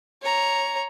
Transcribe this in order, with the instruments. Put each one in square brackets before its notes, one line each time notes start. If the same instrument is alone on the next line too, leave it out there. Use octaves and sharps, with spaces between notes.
[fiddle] C#5 A#5